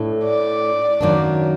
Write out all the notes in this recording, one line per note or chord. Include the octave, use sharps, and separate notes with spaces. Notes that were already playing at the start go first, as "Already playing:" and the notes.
Already playing: A2 A3 D4
D5
F#2 D#3 F#3 A#3 D4